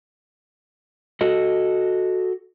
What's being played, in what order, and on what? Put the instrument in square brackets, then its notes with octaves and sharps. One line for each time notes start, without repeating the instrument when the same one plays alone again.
[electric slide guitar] F#4 A4 D#5